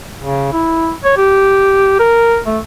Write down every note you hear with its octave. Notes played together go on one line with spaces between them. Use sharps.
C#3
E4
C#5
G4
A#4
A3